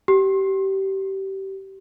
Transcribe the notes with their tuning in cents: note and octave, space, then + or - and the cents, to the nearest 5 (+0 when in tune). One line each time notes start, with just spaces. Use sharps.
G4 -25